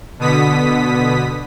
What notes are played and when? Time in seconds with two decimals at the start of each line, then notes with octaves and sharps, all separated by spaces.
0.19 B2 D3 B3 D#6 B6